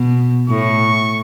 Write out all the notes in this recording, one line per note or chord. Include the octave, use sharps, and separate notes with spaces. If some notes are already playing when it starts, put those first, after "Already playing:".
Already playing: B2
A2 C#6